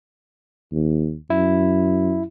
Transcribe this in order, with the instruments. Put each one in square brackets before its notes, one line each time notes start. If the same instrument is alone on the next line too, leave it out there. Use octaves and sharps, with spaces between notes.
[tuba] D#2
[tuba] F#2 [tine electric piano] E4